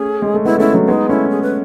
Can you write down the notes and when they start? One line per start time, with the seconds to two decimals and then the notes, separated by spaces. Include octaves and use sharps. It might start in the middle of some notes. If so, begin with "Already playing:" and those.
Already playing: A3 C#4 G#4
0.22 G#3
0.34 A3
0.45 G#3 B3 E4
0.58 A3 C#4 E4
0.73 F#3 A3
0.88 G#3 B3 D#4
1.09 A3 C#4 E4
1.30 G#4
1.42 B4